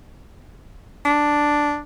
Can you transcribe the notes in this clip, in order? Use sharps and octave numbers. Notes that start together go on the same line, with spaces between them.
D4